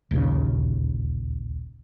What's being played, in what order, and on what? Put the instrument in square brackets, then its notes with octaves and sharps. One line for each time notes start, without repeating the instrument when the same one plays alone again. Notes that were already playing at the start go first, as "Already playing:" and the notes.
[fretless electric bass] D1 A#1 D#2 C#3